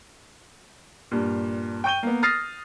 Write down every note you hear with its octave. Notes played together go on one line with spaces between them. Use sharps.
G2 A#2
G5 C#6 G6 D#7 G7
A#3 B3
D#6 F6 A6 A#6 C7